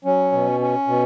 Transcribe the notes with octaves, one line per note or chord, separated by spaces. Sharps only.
F#3 C#4
B2
C#4
B2